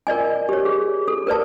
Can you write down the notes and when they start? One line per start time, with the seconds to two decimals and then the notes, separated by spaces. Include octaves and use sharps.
0.07 A#4 D5 D#5 G#5
0.49 G4 C#5
0.65 G#4
1.08 A4
1.27 A#4 B4 D5 A5